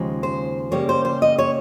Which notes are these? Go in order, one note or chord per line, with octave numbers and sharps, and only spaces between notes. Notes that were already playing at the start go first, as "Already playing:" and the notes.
Already playing: D#2 C#3 F3 G#3
C5
C#3 G3 A#3 C#5
C5
C5
D#5
C#5